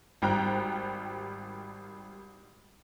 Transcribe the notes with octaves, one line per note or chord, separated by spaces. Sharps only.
G#1 G3 G5 A#5 F#6